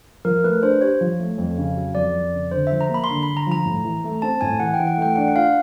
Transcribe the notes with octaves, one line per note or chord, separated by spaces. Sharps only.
F3 A#4
A3 B4
D4 C5
G4 C#5
F3
A3
F2
C#3
F#3
F2 D5
F2
C#3
D3 C5
F3 E5
A#5
A#3
B5
C6
D3 B5
B5
D3
A#5
F3 A#5
A2
E3
A3
C4 A5
A2 G#5
E3 F#5
G5
E3
F#5
A3 G5
D4 F#5
F#5
F4 F5